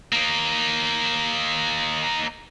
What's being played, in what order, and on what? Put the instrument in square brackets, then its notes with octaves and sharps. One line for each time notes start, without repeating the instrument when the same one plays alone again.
[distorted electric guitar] A#3 D#4